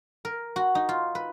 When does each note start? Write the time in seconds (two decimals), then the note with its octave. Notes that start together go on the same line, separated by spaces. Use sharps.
0.25 A#4
0.56 F#4
0.75 D#4
0.89 F4
1.15 B4